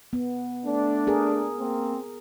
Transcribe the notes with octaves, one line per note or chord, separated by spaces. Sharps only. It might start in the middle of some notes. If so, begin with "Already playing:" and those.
B3
A3 D4
G#4 A#4
A#3 C4